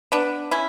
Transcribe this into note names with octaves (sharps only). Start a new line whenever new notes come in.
B3 D4
C#4 E4